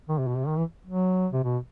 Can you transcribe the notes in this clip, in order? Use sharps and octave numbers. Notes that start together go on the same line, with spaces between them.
D#3
C3
B2
C3
D#3
E3
F#3
C3
B2